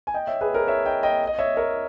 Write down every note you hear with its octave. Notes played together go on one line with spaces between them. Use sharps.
G#5
D#5 G5
C#5 E5
G#4 B4
A#4 C#5
C#5 E5
D#5 G5
D#5 G5
D#5
C#5 E5
A#4 C#5